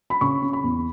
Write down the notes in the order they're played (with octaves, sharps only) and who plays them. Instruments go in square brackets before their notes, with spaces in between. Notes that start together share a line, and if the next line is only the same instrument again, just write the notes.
[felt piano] B5
C#3 C#6
C#4
B5
E2